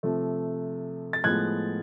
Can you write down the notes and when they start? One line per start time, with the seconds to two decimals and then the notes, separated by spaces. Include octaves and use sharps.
0.03 C3 F3 A3
1.13 A6
1.24 A2 F3 G#3 B3 F#6 G#6